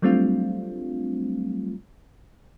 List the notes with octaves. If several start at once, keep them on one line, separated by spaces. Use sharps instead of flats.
F#3 G3 A3 C4 D4 F4